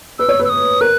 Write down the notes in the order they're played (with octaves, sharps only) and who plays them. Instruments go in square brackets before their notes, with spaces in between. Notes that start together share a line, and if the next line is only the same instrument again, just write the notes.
[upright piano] B4 [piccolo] E6
[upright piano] C#5
B4
[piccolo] E6
D#6
[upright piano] A#4 [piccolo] F#6